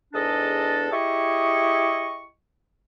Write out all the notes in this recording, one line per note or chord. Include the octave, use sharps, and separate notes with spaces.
E2 G#2 D4 A4 D#5 A5
E4 G4 G#4 D#5 C#6